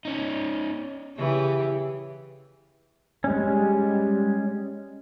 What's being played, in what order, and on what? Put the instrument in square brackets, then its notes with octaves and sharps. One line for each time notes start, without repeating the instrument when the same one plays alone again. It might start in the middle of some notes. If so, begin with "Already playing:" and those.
[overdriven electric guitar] C#4 D#4
[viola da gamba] C#3 E3 G4
[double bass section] G3 [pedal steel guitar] G#3 C#4